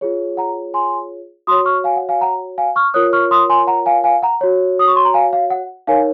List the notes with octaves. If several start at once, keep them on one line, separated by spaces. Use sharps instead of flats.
F4 G#4 C#5
F#5 A#5
G#5 C6
F#4 C#5 C6 D#6
C#6 F6
F5 G#5
F#5
F5 G#5
F#5 A#5
F5 G#5
C#6 F6
F4 A#4 C#5 D#6 F#6
C#6 F6
C6 D#6
G#5 C6
F#5 A#5
F5 G#5
F5 G#5
F#5 A#5
F#4 C#5
D#6
C#6
C6
A#5
F5 G#5
F5
F#5
D#4 A#4 C#5 F5 G#5